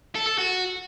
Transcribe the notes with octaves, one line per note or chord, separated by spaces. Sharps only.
A4
A4
F#4